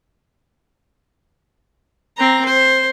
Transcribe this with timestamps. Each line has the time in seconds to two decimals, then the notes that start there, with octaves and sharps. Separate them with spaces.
2.17 C4 A#5
2.45 C5